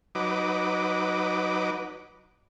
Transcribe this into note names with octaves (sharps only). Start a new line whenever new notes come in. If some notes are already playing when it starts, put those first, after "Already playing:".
F#3 D#4 B4 D6